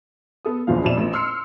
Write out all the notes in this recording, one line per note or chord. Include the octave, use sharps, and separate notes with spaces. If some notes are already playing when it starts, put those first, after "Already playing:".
B3 A4 D#6
F#1 E2 G2 F3 F5
F2 B2 D5 E5 E7
A1 A#2
C6 E6 F6 C7 C#7